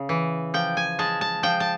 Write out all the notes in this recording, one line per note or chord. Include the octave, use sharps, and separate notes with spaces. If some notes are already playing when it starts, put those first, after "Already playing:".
Already playing: C#3
E3
F3 G5
G#5
G#3 A5
A5
F3 G5
A5